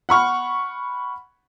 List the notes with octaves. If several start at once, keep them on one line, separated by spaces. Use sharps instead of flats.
F#5 B5 C#6 F6